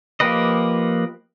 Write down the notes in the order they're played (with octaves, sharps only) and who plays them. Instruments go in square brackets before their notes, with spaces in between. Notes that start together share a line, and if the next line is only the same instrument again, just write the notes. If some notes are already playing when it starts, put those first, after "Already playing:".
[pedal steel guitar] F3 A#3 G4 B4 D#5